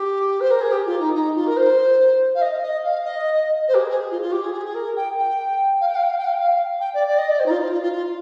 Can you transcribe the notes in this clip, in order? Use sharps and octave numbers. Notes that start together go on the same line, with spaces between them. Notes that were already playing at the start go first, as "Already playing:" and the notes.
Already playing: G4
C5
A#4
G#4
G4
F4
D#4
D#4
F4
A#4
C5
F5
D#5
D#5
F5
D#5
C5
G4
G#4
G#4
F4
F4
G4
G#4
G#4
G#4
A#4
G5
G5
F5
G5
F5
G5
F5
G5
F5
G5
F5
G5
D5
D5
D#5
D5
C5
D#4
F4
F4
F4
F4
F4